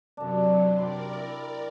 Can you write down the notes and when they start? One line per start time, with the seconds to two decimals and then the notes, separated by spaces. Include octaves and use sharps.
0.17 F#2 C3 F#3 D4
0.76 G4 A#4 D5 B5 C6
1.16 E4